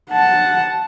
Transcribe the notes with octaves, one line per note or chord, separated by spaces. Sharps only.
F#5 A5